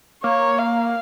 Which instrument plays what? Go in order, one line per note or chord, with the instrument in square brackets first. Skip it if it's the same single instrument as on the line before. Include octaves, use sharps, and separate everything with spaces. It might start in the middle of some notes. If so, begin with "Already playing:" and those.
[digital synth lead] A#3 [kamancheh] C#5
[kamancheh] F5